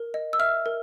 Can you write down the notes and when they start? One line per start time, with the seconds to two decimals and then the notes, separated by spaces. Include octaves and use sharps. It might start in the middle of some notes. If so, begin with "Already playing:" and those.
Already playing: A#4
0.14 D#5
0.33 E6
0.39 E5 F6
0.66 A#4